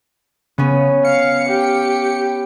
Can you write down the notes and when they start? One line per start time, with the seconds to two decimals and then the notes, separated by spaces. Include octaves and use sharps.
0.58 C#3 B3 C#4
1.05 F5 C#7
1.49 G4